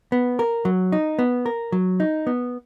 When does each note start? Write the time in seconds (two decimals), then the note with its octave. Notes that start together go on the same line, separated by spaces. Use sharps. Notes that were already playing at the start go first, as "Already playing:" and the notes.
0.12 B3
0.39 A#4
0.65 F#3
0.92 D#4
1.19 B3
1.46 A#4
1.72 F#3
2.00 D#4
2.27 B3